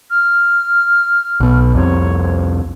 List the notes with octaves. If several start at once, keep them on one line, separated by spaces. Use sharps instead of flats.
F6
B1 B2
C2 F2 C3 C#5